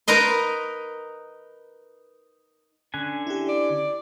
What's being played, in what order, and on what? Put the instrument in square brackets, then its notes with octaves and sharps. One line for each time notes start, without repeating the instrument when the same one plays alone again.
[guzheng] D#4 A#4 B4 D#5 C6
[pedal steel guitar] D3 C#4 G#5 [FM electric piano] F#6
[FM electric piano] E4 G4
[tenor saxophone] D5